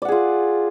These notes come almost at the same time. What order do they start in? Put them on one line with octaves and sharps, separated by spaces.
D5 F#5 G#4 F4